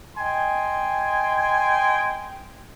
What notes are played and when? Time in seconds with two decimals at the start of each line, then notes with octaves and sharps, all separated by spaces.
0.17 D#5 G5 G#5 C6